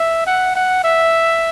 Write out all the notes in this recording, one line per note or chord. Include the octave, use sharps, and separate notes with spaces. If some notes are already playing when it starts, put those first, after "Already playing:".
Already playing: E5
F#5
F#5
E5